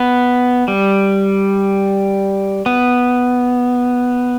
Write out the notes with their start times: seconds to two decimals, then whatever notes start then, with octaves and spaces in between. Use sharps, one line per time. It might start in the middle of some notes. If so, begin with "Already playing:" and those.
Already playing: B3
0.68 G3
2.66 B3